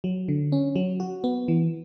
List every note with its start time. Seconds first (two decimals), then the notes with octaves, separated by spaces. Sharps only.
0.04 F#3
0.28 D3
0.52 C#4
0.76 F#3
1.00 F#4
1.24 B3
1.48 E3